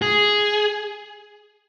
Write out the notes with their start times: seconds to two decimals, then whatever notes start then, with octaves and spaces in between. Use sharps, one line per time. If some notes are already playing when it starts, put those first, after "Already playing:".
0.02 G#4